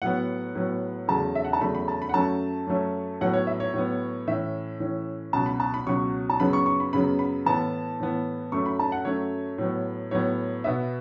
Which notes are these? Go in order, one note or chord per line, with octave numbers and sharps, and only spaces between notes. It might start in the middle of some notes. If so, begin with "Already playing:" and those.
A2 F#3 B3 F#5
A2 F#3 B3
E2 C#3 F#3 A3 A5
E5
F#5
A5
E2 C#3 F#3 A3 B5
B5
A5
B5
F#5
F#2 F#3 A3 C#4 A5
F#2 F#3 A3 C#4
A2 F#3 B3 F#5
C#5
E5
C#5
A2 F#3 B3
A2 E3 C#4 E5
A2 E3 C#4
C#2 B2 F#3 A5
B5
A5
B5
C#2 B2 F#3 C#6
A5
F#2 C#3 F#3 B3 B5
C#6
C#6
B5
F#2 C#3 F#3 B3 B5
B5
A2 E3 B3 A5
A2 E3 B3
F#2 F#3 A3 C#6
B5
A5
F#5
F#2 F#3 A3 C#5
A2 F#3 B3
A2 F#3 B3 C#5
B2 B3 E5